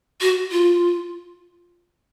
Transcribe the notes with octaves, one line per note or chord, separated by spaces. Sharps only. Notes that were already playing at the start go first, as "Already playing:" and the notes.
F#4
F4